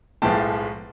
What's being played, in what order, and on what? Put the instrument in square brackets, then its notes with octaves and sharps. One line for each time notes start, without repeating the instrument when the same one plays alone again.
[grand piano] B1 A2 F3 G#3 B3 G5 A5